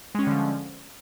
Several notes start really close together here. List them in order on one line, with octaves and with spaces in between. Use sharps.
G#3 C#4 G3 D3 F3